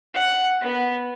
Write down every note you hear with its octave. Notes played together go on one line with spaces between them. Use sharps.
F#5
B3